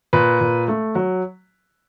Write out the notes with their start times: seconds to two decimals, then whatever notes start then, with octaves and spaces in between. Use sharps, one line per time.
0.13 A#2 B4
0.40 A#2
0.68 A3
0.95 F#3